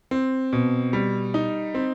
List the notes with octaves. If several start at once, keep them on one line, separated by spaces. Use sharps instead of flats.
C4
B2
G3
D#4
C4